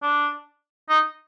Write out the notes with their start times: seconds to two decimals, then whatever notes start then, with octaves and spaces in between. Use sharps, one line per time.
0.02 D4
0.90 D#4